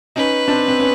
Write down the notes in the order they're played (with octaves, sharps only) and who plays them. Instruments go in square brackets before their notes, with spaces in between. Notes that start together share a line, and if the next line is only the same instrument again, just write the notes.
[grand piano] C#4 D#4 [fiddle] B4
[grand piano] C4 D4
C4
B3 C#4